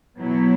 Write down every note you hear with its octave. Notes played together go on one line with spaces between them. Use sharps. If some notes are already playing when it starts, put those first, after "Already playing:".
B2 F#3 B3 E4